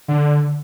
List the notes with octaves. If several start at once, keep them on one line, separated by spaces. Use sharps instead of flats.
D3